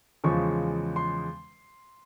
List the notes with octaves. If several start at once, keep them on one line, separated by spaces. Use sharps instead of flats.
E2 C#3 F3 G#3 C#6
C6